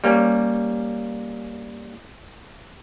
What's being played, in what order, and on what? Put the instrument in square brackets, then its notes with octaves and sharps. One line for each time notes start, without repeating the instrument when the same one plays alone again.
[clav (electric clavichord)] G3 A#3 C#4